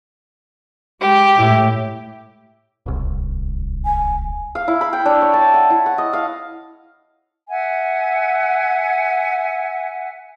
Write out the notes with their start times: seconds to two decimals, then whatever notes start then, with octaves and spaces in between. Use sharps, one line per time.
1.01 G#3 G4
1.36 A2 E4
2.86 D1 C2
3.84 G#5
4.55 F5
4.68 E4
4.81 B5
4.93 G5
5.05 D4
5.21 C#5
5.33 A5
5.54 F#5
5.70 E4
5.86 F#5
5.98 D#5
6.13 F5
7.49 E5 F#5 G#5